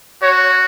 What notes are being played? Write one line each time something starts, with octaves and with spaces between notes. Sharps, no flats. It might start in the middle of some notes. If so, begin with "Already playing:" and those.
F#4 C#5